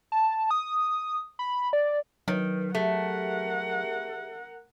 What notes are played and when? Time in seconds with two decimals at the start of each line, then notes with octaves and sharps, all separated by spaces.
0.12 A5
0.51 D#6
1.39 B5
1.73 D5
2.28 D#3 F#3 B4
2.75 A3 G4 G#4 A#4 E5 F#5